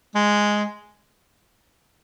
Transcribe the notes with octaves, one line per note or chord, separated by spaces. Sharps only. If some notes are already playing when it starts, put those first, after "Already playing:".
G#3